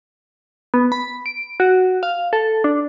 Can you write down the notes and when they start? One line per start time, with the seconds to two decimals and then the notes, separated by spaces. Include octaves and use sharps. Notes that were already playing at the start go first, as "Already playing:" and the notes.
0.74 B3
0.92 B5
1.26 D7
1.60 F#4
2.03 F5
2.33 A4
2.64 D4